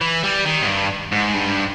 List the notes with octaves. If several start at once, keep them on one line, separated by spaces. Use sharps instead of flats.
E3
G3
D#3
G#2
G2
G#2
G2